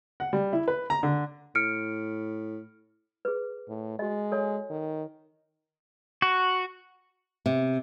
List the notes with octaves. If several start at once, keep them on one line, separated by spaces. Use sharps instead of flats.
F#5
G3
E4
B4
A#5
D3
A2 F6 C#7 D7
G#4 B4
A2
G#3 F#4 D#5
A4 C#5 G#5
D#3
F#4
C3